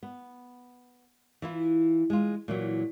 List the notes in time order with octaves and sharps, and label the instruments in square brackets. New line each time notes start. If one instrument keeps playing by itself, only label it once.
[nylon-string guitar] B3
E3 E4 F4
G#3 F4
A#2 E3 F#3